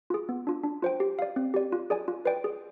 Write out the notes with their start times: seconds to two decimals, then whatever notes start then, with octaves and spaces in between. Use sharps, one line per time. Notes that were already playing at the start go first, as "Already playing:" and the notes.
0.10 F4 G#4
0.29 B3
0.47 D4 F4
0.64 D4
0.82 F4 C5 G5
1.00 G4
1.19 D5 F5
1.36 C4
1.54 G4 D5
1.72 F4
1.90 G#4 D5 G#5
2.08 F4
2.25 B4 D5 G5
2.44 G#4